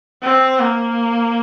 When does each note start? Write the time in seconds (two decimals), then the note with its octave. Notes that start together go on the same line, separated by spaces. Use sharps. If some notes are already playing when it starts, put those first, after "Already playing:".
0.23 C4
0.60 A#3